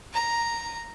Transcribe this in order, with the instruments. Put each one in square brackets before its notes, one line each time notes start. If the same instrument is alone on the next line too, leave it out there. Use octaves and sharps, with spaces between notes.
[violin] A#5